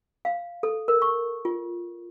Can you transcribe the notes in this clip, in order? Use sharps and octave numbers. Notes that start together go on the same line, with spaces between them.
F5
A4
A#4
C#6
F4